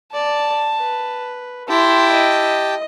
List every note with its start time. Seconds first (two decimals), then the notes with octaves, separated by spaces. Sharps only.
0.14 D5 A5
0.79 B4
1.69 E4 G4 G5 A5 C6
2.12 D#5